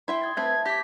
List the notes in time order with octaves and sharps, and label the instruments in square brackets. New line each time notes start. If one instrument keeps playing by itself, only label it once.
[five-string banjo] E4 E5 G5 [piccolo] C6
[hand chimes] D#6 G#6 A6
[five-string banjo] A3 C4 B4 [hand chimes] E5 A5 [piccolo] G#6
[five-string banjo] G4 [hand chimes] D6 A#6 [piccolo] B6